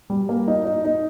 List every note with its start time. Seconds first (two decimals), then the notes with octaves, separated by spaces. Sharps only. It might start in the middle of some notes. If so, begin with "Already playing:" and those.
0.10 G3
0.29 A#3
0.48 D#4
0.65 D#4
0.85 D#4